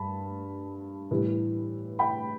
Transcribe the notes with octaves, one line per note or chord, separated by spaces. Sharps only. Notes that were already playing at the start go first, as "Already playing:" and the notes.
Already playing: G2 A5 B5
A2 E3 G3
G5 B5